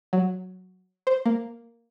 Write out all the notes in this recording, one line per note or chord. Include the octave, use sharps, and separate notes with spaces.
F#3
C5
A#3